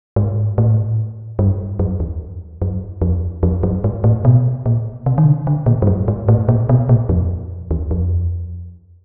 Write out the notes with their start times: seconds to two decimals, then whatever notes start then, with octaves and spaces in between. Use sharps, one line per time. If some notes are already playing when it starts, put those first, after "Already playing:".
0.16 G#2
0.58 A2
1.39 G2
1.79 F#2
2.00 E2
2.62 F#2
3.02 F2
3.43 F2
3.63 F#2
3.84 G#2
4.04 A2
4.25 B2
4.66 A#2
5.06 C3
5.18 D#3
5.26 D3
5.47 D3
5.66 A#2
5.82 G2
5.87 F#2
6.08 G#2
6.28 A2
6.49 A#2
6.69 B2
6.89 A#2
7.09 F2
7.71 E2
7.91 F2